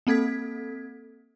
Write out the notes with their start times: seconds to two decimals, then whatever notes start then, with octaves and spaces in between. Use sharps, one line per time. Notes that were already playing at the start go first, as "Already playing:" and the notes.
0.07 A#3 C4 A4 G#6 B6